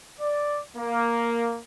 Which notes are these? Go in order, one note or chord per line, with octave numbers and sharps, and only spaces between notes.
D5
A#3